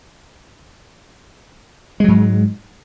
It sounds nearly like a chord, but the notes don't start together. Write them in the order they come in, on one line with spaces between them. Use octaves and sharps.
G#3 F#3 G#2